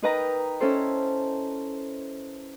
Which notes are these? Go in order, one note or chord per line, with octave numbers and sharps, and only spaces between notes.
D#4 A#4 B4 D#5 G5 A#5
C#4 E4 A4 C5